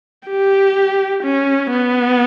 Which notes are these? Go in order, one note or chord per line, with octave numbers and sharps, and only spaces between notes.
G4
C#4
B3